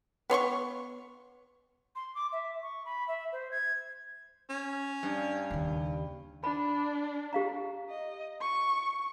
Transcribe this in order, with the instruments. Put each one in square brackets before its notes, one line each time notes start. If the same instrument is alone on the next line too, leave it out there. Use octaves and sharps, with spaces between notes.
[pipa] B3 C#5 C6 C#6
[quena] C6
D6
E5
C#6
B5
E5
C5
G#6
[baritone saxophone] C#4
[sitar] G2
[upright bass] D#2 C#3
[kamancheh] D4 [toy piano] B5
[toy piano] G4 F5 A#5
[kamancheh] D#5
C#6